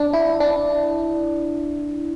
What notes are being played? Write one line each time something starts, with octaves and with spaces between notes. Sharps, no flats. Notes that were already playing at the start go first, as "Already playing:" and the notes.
Already playing: D4
E4
D4